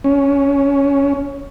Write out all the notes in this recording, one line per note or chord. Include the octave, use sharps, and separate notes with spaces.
C#4